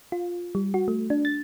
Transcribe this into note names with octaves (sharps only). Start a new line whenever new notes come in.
F4
G3
F#4
A3
D4
A6